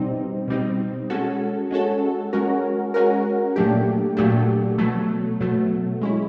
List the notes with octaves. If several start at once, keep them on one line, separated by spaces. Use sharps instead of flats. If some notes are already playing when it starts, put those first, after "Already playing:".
Already playing: B2 G3 C4 D#4
B2 G3 C4 D#4
G#3 C#4 F#4 A4
G#3 C#4 F#4 A4
G#3 C#4 F#4 A#4
G#3 C#4 F#4 A#4
A#2 F#3 A3 D4 G4
A#2 F#3 A3 D4 G4
B2 F#3 A3
B2 F#3 A3
G#3 C#4 E4